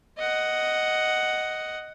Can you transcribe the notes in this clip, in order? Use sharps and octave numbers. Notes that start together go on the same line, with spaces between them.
D#5 F#5